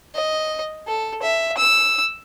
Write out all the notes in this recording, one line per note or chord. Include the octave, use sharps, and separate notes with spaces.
D#5
A4
E5
E6